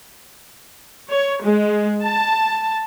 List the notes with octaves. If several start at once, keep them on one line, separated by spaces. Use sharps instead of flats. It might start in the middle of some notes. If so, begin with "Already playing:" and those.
C#5
G#3
A5